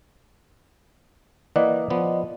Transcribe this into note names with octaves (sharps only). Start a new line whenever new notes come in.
E3 A#3 D5 D#5 F#5
F3 B3